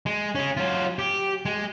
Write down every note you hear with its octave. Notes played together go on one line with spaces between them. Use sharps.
G#3
C#4 G#4
F#3 F4
G4
G#3